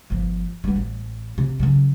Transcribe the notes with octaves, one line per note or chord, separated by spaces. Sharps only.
G1 F3
G3 B3
A1
C3
C#3 F#3